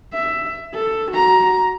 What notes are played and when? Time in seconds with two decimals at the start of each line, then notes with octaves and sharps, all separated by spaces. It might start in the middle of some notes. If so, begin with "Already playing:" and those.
0.13 E5
0.75 A4
1.12 F#4 A#5